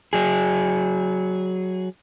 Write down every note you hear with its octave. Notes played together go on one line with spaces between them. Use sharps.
F#3 G#4